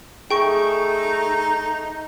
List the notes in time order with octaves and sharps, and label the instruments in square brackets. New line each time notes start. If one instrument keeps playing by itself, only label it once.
[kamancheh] A3 [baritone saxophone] D#4 [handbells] G#4 [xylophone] G5 C#6